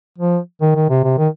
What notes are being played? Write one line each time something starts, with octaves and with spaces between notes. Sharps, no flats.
F3
D#3
D#3
C3
C3
D#3